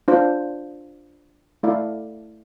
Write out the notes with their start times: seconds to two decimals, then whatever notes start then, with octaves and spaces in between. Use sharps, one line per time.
0.08 D4 F4 C5
1.63 A3 E4 A4 D5 F5